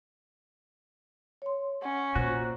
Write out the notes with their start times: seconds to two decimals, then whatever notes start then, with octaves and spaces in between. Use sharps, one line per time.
1.42 C#5 C6
1.82 C#4 F#5
2.15 A#2 F#4 C5